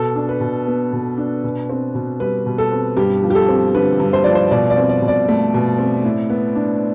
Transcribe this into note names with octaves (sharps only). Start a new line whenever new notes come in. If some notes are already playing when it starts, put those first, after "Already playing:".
Already playing: B2 A4
D4
B4
B2
B3
B2
D4
B2
C4
B2
G3 B4
B2
A4
C4
G2 G4
F3
G4
A4
C4
D3 B4
G2
C5
F3 D5
C5
B2 D5
D5
C4
D5
B2
D5
A3
B2
C4
A2
B3
D4